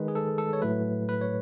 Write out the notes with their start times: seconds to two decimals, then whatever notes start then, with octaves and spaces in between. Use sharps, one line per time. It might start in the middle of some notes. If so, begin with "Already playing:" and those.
Already playing: D#3 G#3 B4
0.08 G#4
0.15 A4
0.38 A4
0.53 C#5
0.62 A2 F#3 A3 B4
1.09 B4
1.21 C#5